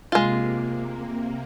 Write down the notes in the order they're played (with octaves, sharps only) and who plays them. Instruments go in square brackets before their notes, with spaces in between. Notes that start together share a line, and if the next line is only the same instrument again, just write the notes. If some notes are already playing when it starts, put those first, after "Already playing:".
[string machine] C3 A#3 [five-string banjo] G#3 F4